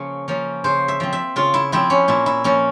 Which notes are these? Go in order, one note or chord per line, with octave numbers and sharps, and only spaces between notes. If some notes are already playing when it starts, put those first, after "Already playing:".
Already playing: C#3 F3 A#3 C#4 C#5
F3 A#3 C#4
C#3 C5
E5
F3 C4
E5
C#3 F4
E4
F3 C4 E4
C#4
A#2 E4
E4
F3 A#3 C#4